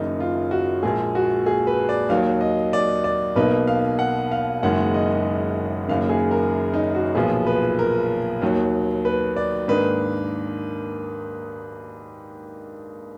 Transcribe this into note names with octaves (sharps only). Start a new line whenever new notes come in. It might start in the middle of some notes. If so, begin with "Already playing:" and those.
Already playing: F#1 F#2 D#3 D#4
F4
F#4
A#1 A#2 G#3 G#4
F#4
G#4
B4
D5
D#2 D#3 F#3 F5
D#5
D5
D5
B1 B2 A#3 D#4 B4
F5
F#5
F5
F#1 F#2 D#3 G#3 F#5
D#5
F#1 F#2 D#3 F5
G#4
A#4
D#4
F#4
B1 A#2 F3 B3 G#4
B4
A#4
D#2 D#3 F#3
B4
D5
G#2 D#3 A#3 D4 B4